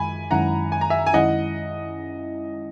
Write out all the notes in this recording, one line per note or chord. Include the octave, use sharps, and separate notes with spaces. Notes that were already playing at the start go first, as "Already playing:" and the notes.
Already playing: F#2 D#3 G#3 G#5 B5
F#2 D#3 G#3 C#4 E4 F#5 A#5
G#5
A#5
E5 G#5
G#5
F#2 D#3 G#3 C#4 E4 D#5 F#5